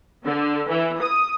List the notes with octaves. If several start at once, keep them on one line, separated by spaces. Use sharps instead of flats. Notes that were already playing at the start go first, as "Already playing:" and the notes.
D3
E3
D#6